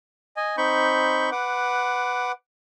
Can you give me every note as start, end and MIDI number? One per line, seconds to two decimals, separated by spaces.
0.37 0.56 75
0.37 0.56 80
0.58 1.30 60
0.58 1.30 63
0.58 1.30 83
0.58 1.30 85
0.58 1.30 91
1.32 2.32 71
1.32 2.32 78
1.32 2.32 86